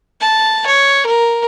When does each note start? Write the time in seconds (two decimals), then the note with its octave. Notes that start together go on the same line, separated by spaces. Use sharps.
0.21 A5
0.66 C#5
1.06 A#4